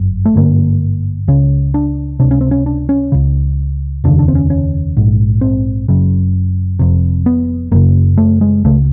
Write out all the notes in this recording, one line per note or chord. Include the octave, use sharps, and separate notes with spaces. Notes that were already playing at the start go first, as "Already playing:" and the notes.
Already playing: G1 F#2
A3
G#1 G2 D3 A#3
C#2 C#3 C#4
D4
C#2 C3 D4
C#4
C4
C#4
D4
C#4
C#2 C#3
F1 D#2 C#3 D4
D4
C4
C#4
C#4
A#1 G#2
C4
F#1 F#2 C#3
F1 F2 C3
B3
F#1 F#2 C#3 A#3
A3
G#3
C#2 C#3 A3